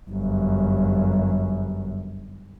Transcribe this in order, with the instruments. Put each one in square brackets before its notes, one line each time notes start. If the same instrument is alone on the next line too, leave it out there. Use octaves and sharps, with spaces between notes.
[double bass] G1 F#2